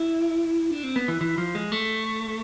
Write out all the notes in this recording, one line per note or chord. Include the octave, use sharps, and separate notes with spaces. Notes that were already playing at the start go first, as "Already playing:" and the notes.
Already playing: E4
D4
C4
B3
E3
E3
F3
G#3
A3